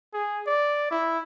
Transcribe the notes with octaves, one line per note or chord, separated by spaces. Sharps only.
G#4
D5
E4